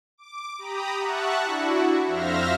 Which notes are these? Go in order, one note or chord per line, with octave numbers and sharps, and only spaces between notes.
D6
G4 A#5 B5 D#6
E5 F#5 A5 C#6 F#6
D4 E4 F#4
F2 C5 E5 F5 F6 A#6